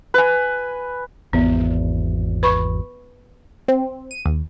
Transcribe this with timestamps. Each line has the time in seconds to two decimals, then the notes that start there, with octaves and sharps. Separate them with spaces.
0.14 B4 G#5
1.33 G#1 E2 B3
2.43 B4 B5 C#6
3.68 C4
4.11 D#7
4.26 D#2